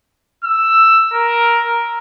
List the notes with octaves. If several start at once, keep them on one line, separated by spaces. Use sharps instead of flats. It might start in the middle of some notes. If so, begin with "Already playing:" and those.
E6
A#4